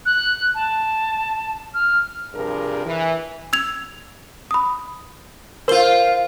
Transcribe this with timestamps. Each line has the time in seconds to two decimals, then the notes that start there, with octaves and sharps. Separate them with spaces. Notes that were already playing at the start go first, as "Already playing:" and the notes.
0.06 F#6
0.55 A5
1.74 F6
2.34 G2 C3 F3 D4 G#4 A#4
2.86 E3
3.53 E6 G#6 F7
4.51 B5 D#6
5.68 F4 A#4 C5 G7